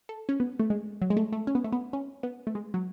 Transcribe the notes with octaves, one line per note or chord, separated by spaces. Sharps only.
A4
C#4
B3
A3
G#3
F#3
G#3
A3
A3
C#4
B3
A3
B3
C#4
B3
A3
G#3
F#3